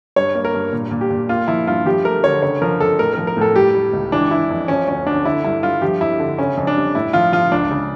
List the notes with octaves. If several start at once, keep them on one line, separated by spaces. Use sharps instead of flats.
G2 C#5
A#3
A#4
G2
A#2
A#2
G4
A#2
A#3 F4
F3 E4
G2 F4
F3 G4
A3 A#4
D3 C#5
C#3 C#5
F3 A#4
F2 A4
A2 A#4
F3 A#4
A#4
A2 A4
G3 G4
G3
C#2
E3 D4
E3 E4
F2
F3 C#4
D2 C#4
D2 D4
D3 E4
G2 E4
G2 F4
F3 G4
F2 E4
D3
C#3 C#4
F2
D4
G3
A2 E4
F3 F4
F3 F4
C#2 D4
C#3